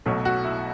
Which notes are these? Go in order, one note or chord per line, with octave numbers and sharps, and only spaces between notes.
B1 B2 F#3 A3
F#4
E4